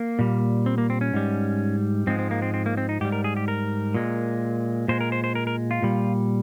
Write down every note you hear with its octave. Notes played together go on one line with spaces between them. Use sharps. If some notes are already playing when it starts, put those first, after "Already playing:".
Already playing: A#3
A#2 G3
C4
A#3
C4
C#4
G#2 G3
G#2 F3 G#3 C4
C4
A#3
C4
C4
A#3
C4
D#4
G#2 G3 G4
A#4
G#4
G4
A#4
A#2 G#3
A#2 G#3 C5
A#4
C5
C5
A#4
A#4
F4
A#2 G3